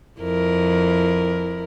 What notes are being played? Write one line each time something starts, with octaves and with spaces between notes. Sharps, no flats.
F2 E4 A#4